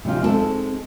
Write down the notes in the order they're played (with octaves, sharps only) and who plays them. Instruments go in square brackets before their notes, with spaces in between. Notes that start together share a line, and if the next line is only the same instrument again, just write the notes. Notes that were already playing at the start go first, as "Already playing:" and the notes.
[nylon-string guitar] C3 E3 C#4 D#4 F4
G#3 C4 D#4 F#4 A4